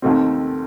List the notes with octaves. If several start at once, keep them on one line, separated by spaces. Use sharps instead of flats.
D#2 D#3 A3 C4